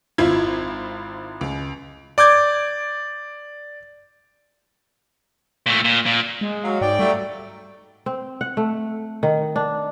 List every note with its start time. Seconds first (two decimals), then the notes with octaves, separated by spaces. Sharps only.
0.18 G#1 E4 F4 G#6
1.41 C#2
2.18 D5 D6 G6 G#6
5.66 A#2 A3
5.84 A#2
6.06 A#2
6.41 G#3
6.63 F#3 F5
6.81 G#2 D5 G5
6.99 F#3 G3 A3
8.06 C4
8.41 F#5
8.57 A3
9.23 D#3
9.56 D4